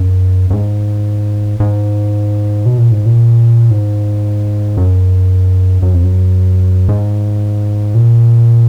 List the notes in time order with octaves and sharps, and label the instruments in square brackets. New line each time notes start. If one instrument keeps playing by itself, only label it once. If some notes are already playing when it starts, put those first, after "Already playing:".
Already playing: [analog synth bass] F#2
F#2
G#2
G#2
B2
A#2
G#2
A#2
G#2
F#2
F#2
F2
F#2
G#2
A#2